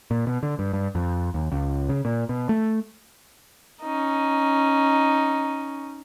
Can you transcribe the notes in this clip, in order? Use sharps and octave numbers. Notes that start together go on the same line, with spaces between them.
A#2
B2
D3
G2
G2
F2
D#2
C#2
C#3
A#2
B2
A3
C#4 D#4